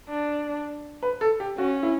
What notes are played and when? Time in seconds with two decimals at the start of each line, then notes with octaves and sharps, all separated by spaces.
0.09 D4
1.03 B4
1.21 A4
1.40 G4
1.58 C#4 F#4
1.83 E4